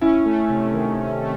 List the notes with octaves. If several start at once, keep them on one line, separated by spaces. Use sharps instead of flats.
C#4 E4
A3
C3
D#3
C#4
A3